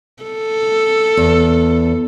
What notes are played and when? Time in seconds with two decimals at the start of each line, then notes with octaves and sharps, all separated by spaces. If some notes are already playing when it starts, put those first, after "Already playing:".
0.23 A4
1.17 E2